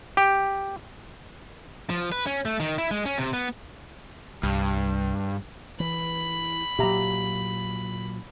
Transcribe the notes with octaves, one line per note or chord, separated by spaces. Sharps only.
G4
F3
B4
C#4
A3
D#3
E4
G#3
C#4
C3
B3
C2 G2
E3 B5
A#2 F#3 G4 E5 A#5